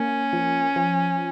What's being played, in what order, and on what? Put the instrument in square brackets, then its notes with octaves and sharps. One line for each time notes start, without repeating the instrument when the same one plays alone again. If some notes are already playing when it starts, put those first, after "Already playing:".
Already playing: [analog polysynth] A#3 [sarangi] C#4
[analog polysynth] F3
F3